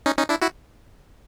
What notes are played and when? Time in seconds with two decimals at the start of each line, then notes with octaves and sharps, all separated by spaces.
0.06 C#4 D#4
0.18 C#4 D#4
0.29 D4 E4
0.42 E4 F#4